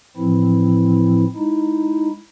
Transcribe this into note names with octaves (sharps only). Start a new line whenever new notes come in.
A2 E3 F3 C4 E4
G#3 D#4 E4